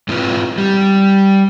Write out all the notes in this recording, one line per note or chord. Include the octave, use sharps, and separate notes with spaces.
G#2 C4 E4 F4 B4
G3